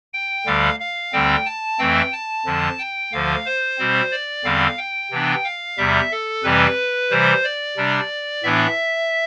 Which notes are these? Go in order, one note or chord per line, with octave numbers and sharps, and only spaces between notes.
G5
D2 D3 G3 F5
F5
D2 D3 G3 C4 G5
A5
F2 E3 A3 C4 G5
A5
F2 D3 F3
G5
D2 D3 F3 F5
C5
B2 G3 C4
D5
E2 D3 G3 C4 F5
G5
C3 E3 B3 D4
F5
E2 C3 G3 E5
A4
F2 C3 E3 G3 C4 B4
C3 E3 G3 C5
D5
C3 G3 D4
A2 E3 B3 D4 E5